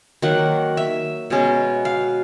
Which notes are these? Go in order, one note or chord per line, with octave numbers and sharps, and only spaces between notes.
D#3 F#3 A#3 F#5
E5
B2 G#3 C#4
F5